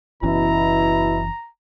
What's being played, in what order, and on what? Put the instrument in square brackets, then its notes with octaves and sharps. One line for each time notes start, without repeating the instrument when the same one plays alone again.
[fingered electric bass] F#1 E3 C#4 [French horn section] B2 E4 [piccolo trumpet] A#5